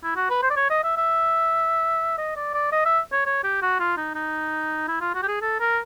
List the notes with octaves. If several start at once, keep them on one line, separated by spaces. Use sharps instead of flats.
E4
F#4
B4
C5
D5
C#5
D#5
E5
E5
D#5
D5
D5
D#5
E5
C#5
C#5
G4
F#4
F4
D#4
D#4
E4
F4
F#4
G4
G#4
A4
A#4